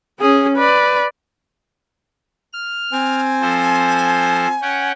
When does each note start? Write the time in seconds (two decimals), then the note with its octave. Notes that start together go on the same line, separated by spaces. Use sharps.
0.20 C#4 G#4
0.57 B4 D5
2.53 F6
2.93 C4 G#5
3.41 F3 A4 C5
4.62 C#4 F#5 G5